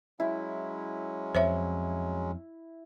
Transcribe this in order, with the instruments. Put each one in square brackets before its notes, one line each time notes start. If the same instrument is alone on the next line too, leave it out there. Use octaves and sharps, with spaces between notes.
[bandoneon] F#3 G#3 C#4 [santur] E4
[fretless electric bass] F2 [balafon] C5 C#5 E5